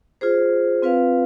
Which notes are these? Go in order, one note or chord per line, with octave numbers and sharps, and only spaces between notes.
F4 G#4 C5
C4 F4 B4 F5